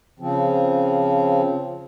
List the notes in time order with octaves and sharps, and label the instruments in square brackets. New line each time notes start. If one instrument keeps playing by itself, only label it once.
[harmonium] C#3 F3 C4